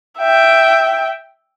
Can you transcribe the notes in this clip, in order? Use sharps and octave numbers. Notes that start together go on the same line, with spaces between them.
E5 G5